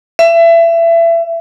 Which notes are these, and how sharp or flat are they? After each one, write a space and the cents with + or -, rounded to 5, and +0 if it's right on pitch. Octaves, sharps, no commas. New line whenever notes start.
E5 +25